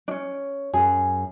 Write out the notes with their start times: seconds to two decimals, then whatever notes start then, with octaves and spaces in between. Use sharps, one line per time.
0.08 C#4 D4
0.74 F#2 G#4